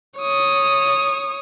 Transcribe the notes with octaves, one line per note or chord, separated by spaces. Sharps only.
C#5 D#6